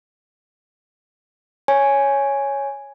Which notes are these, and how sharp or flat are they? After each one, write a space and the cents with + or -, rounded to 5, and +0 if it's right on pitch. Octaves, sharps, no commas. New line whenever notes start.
C#5 +0 G#5 +0